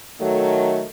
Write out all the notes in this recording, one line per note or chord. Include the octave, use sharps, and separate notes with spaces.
D#3 F#3 A3